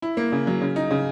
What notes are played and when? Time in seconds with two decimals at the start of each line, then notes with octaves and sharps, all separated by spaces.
0.02 E4
0.17 A#3
0.32 C#3
0.47 F#3
0.61 C#3
0.76 D#4
0.91 C#3